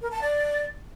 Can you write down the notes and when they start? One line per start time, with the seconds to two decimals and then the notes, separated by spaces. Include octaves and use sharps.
0.02 A#4
0.12 A5
0.22 D5